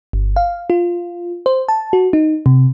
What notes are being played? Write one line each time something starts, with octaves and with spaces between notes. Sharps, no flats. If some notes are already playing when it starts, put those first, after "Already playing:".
G1
F5
F4
C5
A5
F#4
D#4
C3